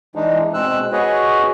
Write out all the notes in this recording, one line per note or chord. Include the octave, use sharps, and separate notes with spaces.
E3 G#3 D4 D#4
B2 G#3 C4 E6 F#6
F#4 G#4 B4 C#5 D#5